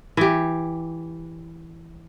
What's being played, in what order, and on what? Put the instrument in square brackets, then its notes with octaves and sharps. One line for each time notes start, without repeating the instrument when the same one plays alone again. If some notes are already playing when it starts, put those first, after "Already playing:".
[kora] E3 G4